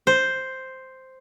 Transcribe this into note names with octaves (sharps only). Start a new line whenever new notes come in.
C5